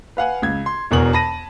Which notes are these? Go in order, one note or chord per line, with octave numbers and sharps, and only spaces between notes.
B4 F5 F#5 G#5
C#2 G#6
C6
E1 E2 B2 D4 A#4 F#7
A5 B5 A#6 D#7